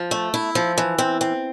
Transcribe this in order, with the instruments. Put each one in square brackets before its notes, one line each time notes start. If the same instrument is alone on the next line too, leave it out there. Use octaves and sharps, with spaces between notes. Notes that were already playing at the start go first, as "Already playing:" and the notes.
Already playing: [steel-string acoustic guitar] F3
A3
E4
F3
E3
C4
C4